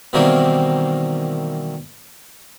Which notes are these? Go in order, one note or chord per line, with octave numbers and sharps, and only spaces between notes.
B2 D#3 E3 G3 A#3 C4